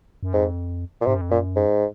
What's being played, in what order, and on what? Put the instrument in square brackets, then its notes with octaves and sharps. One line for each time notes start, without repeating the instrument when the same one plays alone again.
[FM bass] F#2
[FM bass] F2 [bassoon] G#2
[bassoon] A#2
[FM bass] G#2 [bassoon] C3
[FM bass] F#2
F2
[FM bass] F#2 [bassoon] A#2
[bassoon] G#2